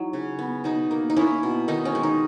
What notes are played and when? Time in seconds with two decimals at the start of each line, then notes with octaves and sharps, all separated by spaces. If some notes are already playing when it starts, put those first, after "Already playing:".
Already playing: E3 F#3 D#4
0.13 C#3
0.39 B3
0.64 B2 D#4
0.91 A#3
1.10 D#4
1.16 A#3 C#4 E4
1.43 B2
1.68 D#3 D#4
1.85 C#4
1.95 G#3
2.03 D#4